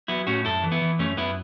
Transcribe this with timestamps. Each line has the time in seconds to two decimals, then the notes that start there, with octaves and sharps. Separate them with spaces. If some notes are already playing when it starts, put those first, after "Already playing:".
0.08 F#3 B3 E4
0.27 A2 C#4 F#4
0.45 F#2 E4 A4
0.64 E3
0.72 B3 E4
0.82 E3
0.99 F#2 A3 C#4
1.17 F#2 B3 E4